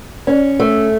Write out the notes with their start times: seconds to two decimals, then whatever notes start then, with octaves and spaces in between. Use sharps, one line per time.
0.27 C#4
0.60 A3